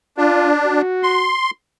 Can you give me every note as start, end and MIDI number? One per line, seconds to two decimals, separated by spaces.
0.18 0.82 62
0.18 0.50 65
0.64 1.32 66
1.03 1.51 84